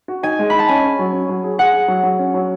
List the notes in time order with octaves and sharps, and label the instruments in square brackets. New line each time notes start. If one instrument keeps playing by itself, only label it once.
[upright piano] F#4
[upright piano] D#4 [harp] G#5
[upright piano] G#3
[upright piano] D#4 [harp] B5
[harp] A5
[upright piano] C#4 [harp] G#5
[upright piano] C#4
F#3
C#4
F#3
G#4
[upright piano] G#4 [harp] F#5
[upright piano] G#4
F#3
F#3
C#4
F#3